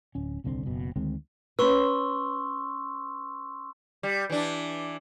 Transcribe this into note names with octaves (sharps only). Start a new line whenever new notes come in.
D1 C#4
D#1 C2 D3 C4
F#1 B2
D2 D#3 G#3 C4
C#4 B4 C6 C#6 E6
G3
E3 D4